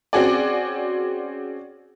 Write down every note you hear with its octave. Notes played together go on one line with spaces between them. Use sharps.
C4 C#4 F#4 G#4 D5